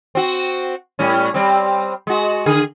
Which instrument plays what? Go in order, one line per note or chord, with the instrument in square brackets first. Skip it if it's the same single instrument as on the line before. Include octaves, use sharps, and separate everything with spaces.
[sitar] C4 F#4
A2 G3 C#4
G3 C4
G#3 F#4
D3 G#4